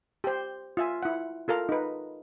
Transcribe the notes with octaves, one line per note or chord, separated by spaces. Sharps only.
G4 C5
F4 E5 G#5
E4 F#5
F4 A4 A#4 F5
D#4 B4